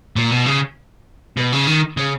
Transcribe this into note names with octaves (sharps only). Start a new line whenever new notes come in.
A#2
B2
C#3
B2
C#3
D#3
C#3